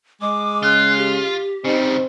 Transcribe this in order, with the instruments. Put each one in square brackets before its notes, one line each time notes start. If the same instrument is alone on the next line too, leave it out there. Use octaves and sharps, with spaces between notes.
[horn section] G#3 [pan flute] D6
[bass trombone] C#3 [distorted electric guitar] F4 [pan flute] F#6
[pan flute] G4
[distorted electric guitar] C#3 G3 [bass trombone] C4 [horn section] D#4